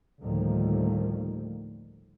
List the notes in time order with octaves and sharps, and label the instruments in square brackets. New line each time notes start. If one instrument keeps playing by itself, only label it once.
[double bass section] D2 A2 D#3 F3 G3 A#3